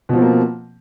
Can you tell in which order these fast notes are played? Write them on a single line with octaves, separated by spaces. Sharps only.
B2 F3 C4 A#3